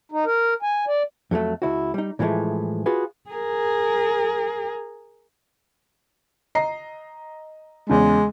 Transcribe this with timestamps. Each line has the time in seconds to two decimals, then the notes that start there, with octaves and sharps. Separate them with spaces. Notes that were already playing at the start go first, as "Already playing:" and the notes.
0.12 D#4
0.26 A#4
0.63 G#5
0.87 D5
1.31 F2 F#3 G#3 A3
1.62 C#2 E4 F#4
1.94 G3 D#4
2.19 A2 E3 F3 G#3 A3
2.86 F4 F#4 G#4 B4
3.30 G#4 A#4
6.55 D#5 A#5 C7
7.89 E2 C#3 G#3